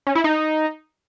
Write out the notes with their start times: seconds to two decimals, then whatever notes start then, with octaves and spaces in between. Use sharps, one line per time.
0.07 C#4
0.15 E4
0.24 D#4